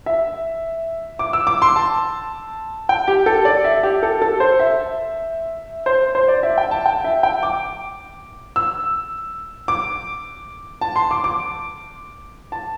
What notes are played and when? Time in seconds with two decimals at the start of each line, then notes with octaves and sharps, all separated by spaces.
0.06 E5
1.19 D6
1.33 E6
1.47 D6
1.62 C6
1.76 A5
2.89 G5
3.08 G4
3.26 A4
3.45 D5
3.64 E5
3.83 G4
4.03 A4
4.22 A4
4.40 C5
4.59 E5
5.86 C5
6.15 C5
6.28 D5
6.43 E5
6.58 G5
6.71 A5
6.86 G5
7.04 E5
7.23 G5
7.43 D6
8.56 E6
9.68 D6
10.81 A5
10.96 C6
11.11 D6
11.24 D6
12.52 A5